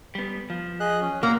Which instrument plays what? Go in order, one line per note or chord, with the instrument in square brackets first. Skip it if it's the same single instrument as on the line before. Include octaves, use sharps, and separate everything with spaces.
[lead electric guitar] G3 B3
F3
[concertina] G#4 D#5 F#6
C#4
[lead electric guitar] A#2 [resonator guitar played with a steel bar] A#3 [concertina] F#5 A#5